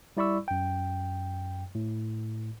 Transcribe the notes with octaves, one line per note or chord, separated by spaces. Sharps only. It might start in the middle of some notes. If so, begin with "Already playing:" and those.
G3 E4 D5 B5 C#6 E6
F#2 G5
A2